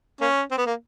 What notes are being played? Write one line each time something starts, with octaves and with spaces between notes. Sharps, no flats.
A#3 C#4
C4
B3
A#3